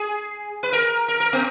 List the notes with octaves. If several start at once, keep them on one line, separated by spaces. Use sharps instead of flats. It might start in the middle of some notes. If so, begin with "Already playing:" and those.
Already playing: G#4
B4
A#4
A#4
A#4
B3